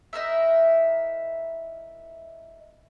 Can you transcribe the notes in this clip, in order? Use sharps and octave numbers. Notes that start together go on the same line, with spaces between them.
D#4 E4 A#4 E5